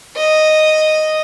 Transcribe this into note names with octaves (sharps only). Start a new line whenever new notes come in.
D#5